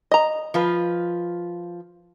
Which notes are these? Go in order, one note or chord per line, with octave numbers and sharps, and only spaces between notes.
D#5 A#5
F3 F4 B4